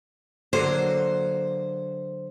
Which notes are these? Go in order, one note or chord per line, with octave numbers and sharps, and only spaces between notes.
D3 F#3 A#3 C5